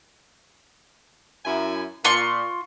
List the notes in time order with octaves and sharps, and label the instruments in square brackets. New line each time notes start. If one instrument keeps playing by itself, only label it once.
[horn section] F#2 E4 G#5
[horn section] A#2 [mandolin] F4 C6 C#6